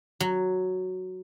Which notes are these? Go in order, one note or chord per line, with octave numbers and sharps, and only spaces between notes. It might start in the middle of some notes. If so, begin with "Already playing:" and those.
F#3